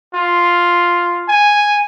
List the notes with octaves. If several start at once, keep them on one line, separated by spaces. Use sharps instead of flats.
F4
G#5